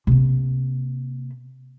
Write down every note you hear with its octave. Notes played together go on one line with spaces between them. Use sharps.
C3 A#3